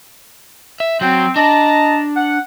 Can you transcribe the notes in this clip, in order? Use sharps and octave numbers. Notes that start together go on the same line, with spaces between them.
E5
F#3 C4 F#4
D4 D#5 A5 A#5
F#5